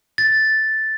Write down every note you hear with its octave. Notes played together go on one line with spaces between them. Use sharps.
A6